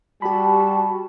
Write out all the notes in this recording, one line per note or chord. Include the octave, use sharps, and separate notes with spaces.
G3 F#4 G4 A5 B5